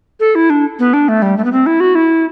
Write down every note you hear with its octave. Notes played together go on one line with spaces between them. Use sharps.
A4
E4
D4
B3
D4
A3
G3
A3
B3
C4
E4
F#4
E4